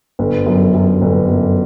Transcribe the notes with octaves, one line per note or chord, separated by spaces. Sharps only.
G1
F#2
F#2
G1
F#2